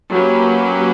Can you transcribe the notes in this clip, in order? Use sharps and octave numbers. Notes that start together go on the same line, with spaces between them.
F#3 A#3 C#4 G4 B4